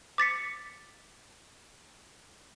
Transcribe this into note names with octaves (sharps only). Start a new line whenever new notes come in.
D6 A6 B6 C#7